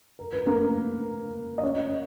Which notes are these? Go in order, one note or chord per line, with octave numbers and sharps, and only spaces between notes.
A#4
B4
A#3 A#4
D#5
C#4 C#5